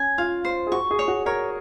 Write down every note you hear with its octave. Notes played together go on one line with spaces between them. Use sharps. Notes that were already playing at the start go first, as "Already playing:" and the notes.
Already playing: C#4 G#5
F4 F5
C5
G#4
F#4 C#6
G#4
C#5
F#4
A#4 C#5